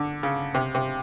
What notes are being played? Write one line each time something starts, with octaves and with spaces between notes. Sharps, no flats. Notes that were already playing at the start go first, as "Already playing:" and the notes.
Already playing: D3
C#3
C3
C3